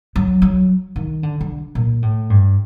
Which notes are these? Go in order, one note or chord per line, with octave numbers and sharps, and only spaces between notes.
F#3
F#3
D#3
D3
D3
A#2
A2
G2